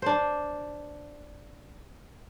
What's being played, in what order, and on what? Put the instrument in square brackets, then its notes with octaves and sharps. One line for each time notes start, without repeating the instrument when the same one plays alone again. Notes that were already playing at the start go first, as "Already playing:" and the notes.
[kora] D4 C5